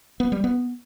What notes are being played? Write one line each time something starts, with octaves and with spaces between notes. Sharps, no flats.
B3
G3
B3